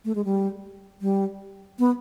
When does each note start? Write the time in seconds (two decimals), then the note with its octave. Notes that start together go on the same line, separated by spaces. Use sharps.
0.05 A3
0.15 G#3
0.25 G3
1.02 G3
1.79 B3